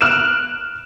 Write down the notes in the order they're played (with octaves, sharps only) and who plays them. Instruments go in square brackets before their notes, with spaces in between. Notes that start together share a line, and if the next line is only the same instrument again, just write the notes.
[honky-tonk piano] F6 F#6 D7 E7